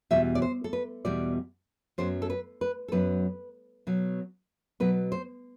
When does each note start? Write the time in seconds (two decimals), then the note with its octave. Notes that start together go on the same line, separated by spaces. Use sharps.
0.11 E2 B2 G3 E5
0.35 D5
0.42 C5
0.64 A4
0.73 B4
1.05 E2 B2 G3 D5
1.98 F#2 F#3 B3 C5
2.22 A4
2.30 B4
2.61 B4
2.88 A4
2.92 F#2 F#3 B3 B4
3.87 B2 F#3 B3
4.80 B2 F#3 B3 B4
5.12 C5